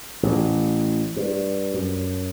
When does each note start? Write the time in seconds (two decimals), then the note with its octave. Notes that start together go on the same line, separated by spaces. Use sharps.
0.23 A1
1.16 G2
1.74 F#2